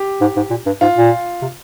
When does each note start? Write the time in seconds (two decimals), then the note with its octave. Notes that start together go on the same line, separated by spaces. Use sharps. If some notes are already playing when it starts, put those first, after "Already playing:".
Already playing: G4
0.21 G#2
0.36 G#2
0.50 A#2
0.66 G2
0.81 G#2 F4
0.97 A#2
1.42 C3